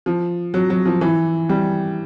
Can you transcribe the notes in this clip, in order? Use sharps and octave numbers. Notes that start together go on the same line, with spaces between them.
F3
F#3
F#3
F3
E3
G3